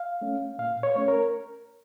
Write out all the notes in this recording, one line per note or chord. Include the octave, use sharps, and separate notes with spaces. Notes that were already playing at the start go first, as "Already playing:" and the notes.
Already playing: F5
A3 C#4
A#2 F5
C#5
A3 C#4 C#5
A#4